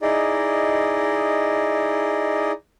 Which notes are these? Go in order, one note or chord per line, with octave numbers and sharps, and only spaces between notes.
D#4 E4 G#4 D5 D#5